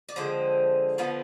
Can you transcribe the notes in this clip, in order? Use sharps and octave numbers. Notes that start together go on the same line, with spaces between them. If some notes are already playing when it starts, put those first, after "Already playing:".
D5
D3 F3 G#3 C4 C5
D3 F3 B3